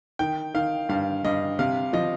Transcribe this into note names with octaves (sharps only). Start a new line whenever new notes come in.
D#3 G5
D#3 F5
G2 F5
G2 D#5
C3 F5
F3 D#5